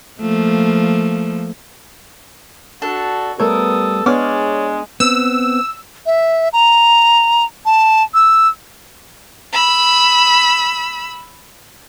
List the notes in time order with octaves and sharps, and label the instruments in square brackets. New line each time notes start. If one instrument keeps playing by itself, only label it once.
[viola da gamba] F3 A3 A#3
[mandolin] D4 A4 [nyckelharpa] F#4
[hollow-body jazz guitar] G3 A3 C#5 [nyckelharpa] B3 D#6 [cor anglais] A4 [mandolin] A#4
[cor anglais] G#3 [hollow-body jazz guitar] B3 D4 G#4 [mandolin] C#5 D6 F6 [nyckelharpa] D5
[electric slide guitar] B3 C4 [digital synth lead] E6
[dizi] E5
A#5
A5
E6
[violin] B5 E6